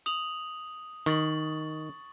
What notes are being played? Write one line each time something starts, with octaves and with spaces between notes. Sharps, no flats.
D#6 F7 F#7
D#3 C#6 A6 F#7